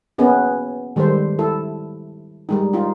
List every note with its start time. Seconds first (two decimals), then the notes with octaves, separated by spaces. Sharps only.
0.18 A#3 B3 C#4 G#4
0.96 D#3 G3 G#3 A4 C5
1.39 E4 A4
2.49 G3 G#3 D#4
2.73 D#4 F4